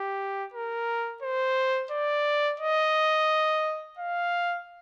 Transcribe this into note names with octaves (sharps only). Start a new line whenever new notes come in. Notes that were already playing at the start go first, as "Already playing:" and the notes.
Already playing: G4
A#4
C5
D5
D#5
F5